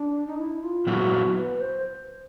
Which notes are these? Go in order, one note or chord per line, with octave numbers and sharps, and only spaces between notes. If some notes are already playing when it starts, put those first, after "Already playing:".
Already playing: D4
D#4
E4
F4
A#2 F#3 B3 E4 F#4
B4
C5